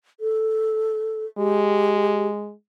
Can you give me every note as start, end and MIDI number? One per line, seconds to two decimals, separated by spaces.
0.20 1.25 69
1.38 2.53 56
1.38 2.27 67